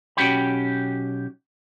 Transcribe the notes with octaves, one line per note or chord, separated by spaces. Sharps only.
B1 C#4 F#4 G4 G5 B5